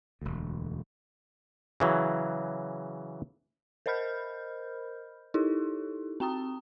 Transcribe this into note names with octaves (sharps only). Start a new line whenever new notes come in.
E1 D2
C#3 E3 F#3
A#4 C5 D#5 B5 F6 G6
D#4 E4 G4 A4
C4 G5 A#5 D#6